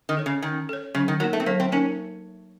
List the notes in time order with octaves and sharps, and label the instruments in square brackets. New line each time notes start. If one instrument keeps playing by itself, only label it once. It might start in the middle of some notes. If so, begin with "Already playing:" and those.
[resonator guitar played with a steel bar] D#3
[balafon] A4 C#5
[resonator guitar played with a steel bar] C#3
[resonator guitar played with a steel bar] D#3 [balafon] C#4
[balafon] A4 C#5
[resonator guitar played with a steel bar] C#3 [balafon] F#3
[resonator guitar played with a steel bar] D#3
[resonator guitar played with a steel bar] F#3 [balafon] A#3 D#4 A#4
[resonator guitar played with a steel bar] A3
C4
[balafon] F#3 [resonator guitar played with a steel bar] A#3
[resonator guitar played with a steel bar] C4
[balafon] A#3 D#4 A#4 [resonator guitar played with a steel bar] C#4